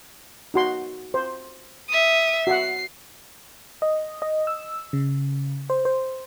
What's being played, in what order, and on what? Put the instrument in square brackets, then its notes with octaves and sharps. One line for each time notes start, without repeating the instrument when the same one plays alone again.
[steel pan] D#4 F#4 C6
C5
[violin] E5 D#6
[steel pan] F#4 E5 F#5 [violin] C7
[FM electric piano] D#5
D#5
E6
C#3
C5
C5